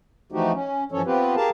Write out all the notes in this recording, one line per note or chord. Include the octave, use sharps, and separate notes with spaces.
E3 F3 A3 D#4 F#4 G4
C#4
G2 E3 F3 C#4 A4 C#5
B3 C4 F4 G4 B4
G4 G#4 A#4 F5 A5